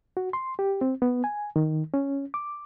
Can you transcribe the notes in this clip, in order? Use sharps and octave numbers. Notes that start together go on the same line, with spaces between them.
F#4
C6
G4
C4
B3
G#5
D#3
C#4
D6